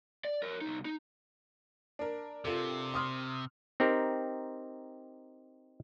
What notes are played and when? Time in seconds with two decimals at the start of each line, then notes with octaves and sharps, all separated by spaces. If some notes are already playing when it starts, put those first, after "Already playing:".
0.25 D5
0.43 A#4 C#5
0.61 C2 D#4
0.85 D#4
1.99 D4 A#4
2.45 C3 F4 A4
2.94 C6 D#6 F6
3.80 C4 D#4 G4 A#4